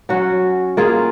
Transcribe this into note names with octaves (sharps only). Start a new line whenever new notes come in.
F#3 C#4 F#4
A#3 F4 G#4